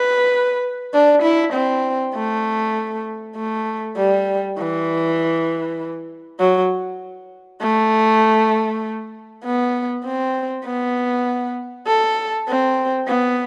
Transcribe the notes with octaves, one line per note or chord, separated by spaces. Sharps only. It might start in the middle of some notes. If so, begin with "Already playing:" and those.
Already playing: B4
D4
E4
C4
A3
A3
G3
E3
F#3
A3
B3
C4
B3
A4
C4
B3